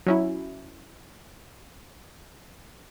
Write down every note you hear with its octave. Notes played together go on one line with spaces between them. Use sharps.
F#3 C#4 E4